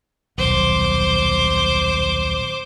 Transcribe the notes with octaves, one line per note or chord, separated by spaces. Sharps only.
D#1 B1 C5 D6